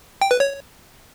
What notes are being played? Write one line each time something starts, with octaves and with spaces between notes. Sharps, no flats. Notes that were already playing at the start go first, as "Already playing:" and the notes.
G5
B4
C#5